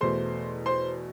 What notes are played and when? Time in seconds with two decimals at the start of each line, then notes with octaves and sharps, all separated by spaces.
0.01 E2 B2 A3 C5 C6
0.66 C5 C6